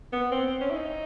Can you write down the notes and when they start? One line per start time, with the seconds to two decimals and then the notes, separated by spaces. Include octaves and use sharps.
0.12 B3
0.31 C4
0.47 C4
0.61 C#4
0.70 E4
0.75 D#4